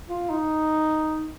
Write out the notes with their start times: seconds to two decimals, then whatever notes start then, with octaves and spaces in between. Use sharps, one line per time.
0.09 F4
0.30 D#4